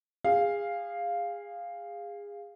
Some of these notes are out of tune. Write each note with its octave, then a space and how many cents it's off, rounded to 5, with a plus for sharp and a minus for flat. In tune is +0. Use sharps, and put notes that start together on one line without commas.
G#4 -25 F5 +0